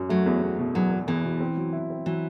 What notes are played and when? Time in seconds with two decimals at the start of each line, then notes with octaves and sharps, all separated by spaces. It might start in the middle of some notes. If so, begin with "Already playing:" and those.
Already playing: F#2
0.09 F#3 A3
0.26 E2
0.42 E2
0.59 B2
0.75 E2 F#3
0.91 E2
1.07 E2 E3
1.24 B2
1.40 C4
1.57 F#3
1.73 E4
1.90 C4
2.06 E3 F#3